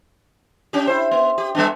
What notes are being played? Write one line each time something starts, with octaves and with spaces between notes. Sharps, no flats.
C#4 G4
E4 C5
B3
G4
G3 B3 D4